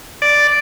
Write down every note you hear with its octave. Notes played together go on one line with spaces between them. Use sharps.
D5